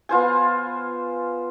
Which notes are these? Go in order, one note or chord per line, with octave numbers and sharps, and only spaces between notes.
B3 F4 C5 G#5